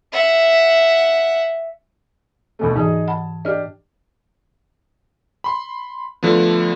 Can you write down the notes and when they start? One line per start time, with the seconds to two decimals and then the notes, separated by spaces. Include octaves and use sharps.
0.12 E5 F#5
2.59 D2 B2 A3
2.76 G#2 D3 E3 D#4 G#4 D#5
3.08 F#5 A5 B5
3.45 D4 G4 D#5 F6
5.44 B5 C6
6.23 D3 F3 A3 B3